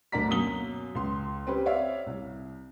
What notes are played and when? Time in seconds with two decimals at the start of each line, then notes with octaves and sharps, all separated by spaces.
0.12 D2 D4 A#4 D5 A#5 B6
0.28 F#2 B2 A#3 D#6 G7
0.95 C#2 C6
1.47 C4 C#4 G4 B4
1.66 C#5 D5 E5 F5
2.07 C2